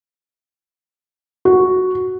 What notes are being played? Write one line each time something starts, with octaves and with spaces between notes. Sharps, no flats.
F#4